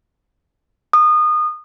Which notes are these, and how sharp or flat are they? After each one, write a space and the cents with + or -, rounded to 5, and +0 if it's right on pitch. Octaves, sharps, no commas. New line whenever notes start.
D#6 -25